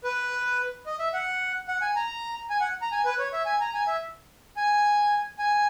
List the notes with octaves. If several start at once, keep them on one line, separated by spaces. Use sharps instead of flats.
B4
D#5
E5
F#5
F#5
G#5
A#5
G#5
F#5
A#5
G#5
B4
C#5
E5
G#5
A#5
G#5
E5
G#5
G#5